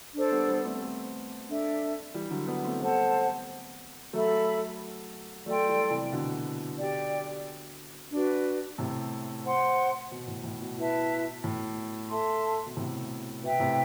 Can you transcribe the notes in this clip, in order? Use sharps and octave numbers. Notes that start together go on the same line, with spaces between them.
D4 A4 C5
G3 B3
G3 B3
A3 C4
A3 C4
D4 A4 E5
E3 G3
D3 F#3
B3 D4
A3 C4
G3 B3 A4 C5 F#5 A5
F#3 A3 A4 E5 B5
F#3 A3 A4 D5 G5 C6
E3 G3
C3 E3
B2 D3
G4 D5 G5
D4 F#4 B4
A2 C3
C5 F#5 C6
B2
A2
A2
B2
E4 B4 E5 A5
A2
A4 E5 A5 C6
B2
A2 C3
B2 B4 E5 G5
A2 C3